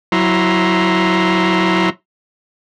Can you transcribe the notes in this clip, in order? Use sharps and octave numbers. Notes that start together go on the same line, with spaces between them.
F#3 E4 A#5 C6